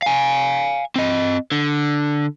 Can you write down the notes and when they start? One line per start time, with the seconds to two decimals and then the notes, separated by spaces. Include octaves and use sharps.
0.02 F5 G#5
0.96 C4 D#5
1.52 D3